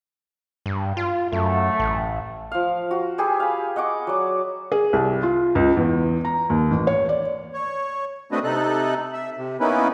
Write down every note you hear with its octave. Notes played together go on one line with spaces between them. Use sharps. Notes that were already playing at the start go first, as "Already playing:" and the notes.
G2
F4
F#2 A3
A1
F3 F5
F#4
G4 G#4 B4 G#5
F5 B5
D#5 F#5 C#6 D6
F#3 D5
G#4
C2
F4
C#2
E2
A#5
D#2
A1
C#5
D5
C#5
A3 C4 D4 F#4 B4 D#5
C3 D#4 A4 F#6
E5
C3
A#3 B3 C#4 D#4 E4 B4